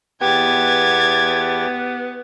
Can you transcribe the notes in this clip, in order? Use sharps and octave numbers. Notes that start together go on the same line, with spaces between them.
E2 B3 G4 G5 G#6 A6